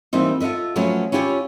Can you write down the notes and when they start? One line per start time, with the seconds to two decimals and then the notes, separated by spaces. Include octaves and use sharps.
0.13 E3 G3 A#3 C4 D#4
0.40 F4 A4 B4 D#5 E5
0.76 F3 F#3 A3 B3 C#4
1.12 C#4 E4 F4 G4 A#4 C#5